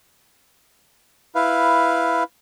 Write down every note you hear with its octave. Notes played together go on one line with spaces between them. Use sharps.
E4 B4 F5